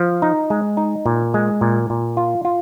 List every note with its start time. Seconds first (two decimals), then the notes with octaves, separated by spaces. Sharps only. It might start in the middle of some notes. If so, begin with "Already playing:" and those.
Already playing: F3
0.22 D#4
0.50 G#3
0.77 D#4
1.06 A#2
1.34 G#3
1.61 A#2
1.90 A#2
2.17 F4
2.45 F4